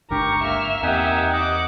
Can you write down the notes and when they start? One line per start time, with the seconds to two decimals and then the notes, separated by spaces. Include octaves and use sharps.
0.11 G1 C#2 D4 G4 A#4 A#5 C#6
0.44 A#3 E5 F6
0.83 E2 A#3 C4 D#4 G4 F#5 G#5
1.33 D#5 F#5 D6